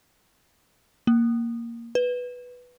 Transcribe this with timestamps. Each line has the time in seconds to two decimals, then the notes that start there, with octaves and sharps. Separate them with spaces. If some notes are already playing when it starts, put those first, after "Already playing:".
1.07 A#3
1.95 B4